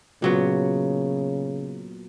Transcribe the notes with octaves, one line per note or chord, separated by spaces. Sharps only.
A#2 C#3 F#3 B3